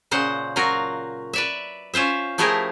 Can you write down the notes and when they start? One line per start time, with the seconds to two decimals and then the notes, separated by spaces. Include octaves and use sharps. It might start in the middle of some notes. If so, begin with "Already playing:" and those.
0.11 A#2 C#3 C5 F#5
0.56 F#3 F4 F#4 A#4
1.33 B4 D5 E5
1.94 C#4 F4 C5 E5
2.38 F3 A3 E4 G4 G#4 A#4